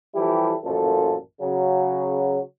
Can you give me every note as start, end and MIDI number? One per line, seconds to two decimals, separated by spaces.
0.15 0.53 52
0.15 0.53 53
0.15 0.53 55
0.15 0.53 64
0.15 0.53 67
0.15 0.53 69
0.63 1.13 33
0.63 1.13 42
0.63 1.13 46
0.63 1.13 53
0.63 1.13 69
1.41 2.39 49
1.41 2.39 54